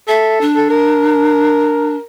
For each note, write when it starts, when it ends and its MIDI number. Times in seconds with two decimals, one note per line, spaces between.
0.08 0.45 69
0.08 0.41 76
0.41 1.96 62
0.57 0.68 69
0.70 2.06 70